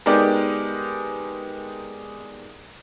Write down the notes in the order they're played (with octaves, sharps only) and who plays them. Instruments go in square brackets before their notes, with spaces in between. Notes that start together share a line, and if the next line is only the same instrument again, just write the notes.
[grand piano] G#3 B3 D#4 G4 A#4 D5